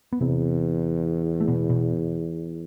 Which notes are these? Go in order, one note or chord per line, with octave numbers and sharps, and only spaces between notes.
B3
E2 C3 C4
A3
B2 B3
B2 B3